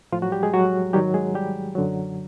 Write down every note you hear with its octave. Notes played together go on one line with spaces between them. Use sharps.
A2 F3 F4
F#3 F#4
G3 G4
G#3 G#4
F#3 F#4
G#2 D#3 F#3 G3 G4
G#3 G#4
G3 G4
F#2 D3 F#3